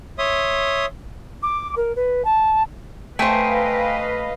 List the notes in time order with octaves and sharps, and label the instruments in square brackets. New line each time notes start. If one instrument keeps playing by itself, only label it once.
[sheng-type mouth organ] C#5 E5 C6 D#6
[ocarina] D6
A#4
B4
A5
[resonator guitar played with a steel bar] A3 C5 [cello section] B4 D#5 F5 [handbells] G5 G#5